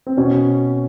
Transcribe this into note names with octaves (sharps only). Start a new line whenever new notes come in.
C4
B2 C#4